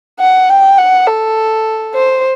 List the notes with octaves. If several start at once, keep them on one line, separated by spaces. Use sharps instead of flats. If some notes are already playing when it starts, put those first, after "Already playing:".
F#5
G5
F#5
A4
C5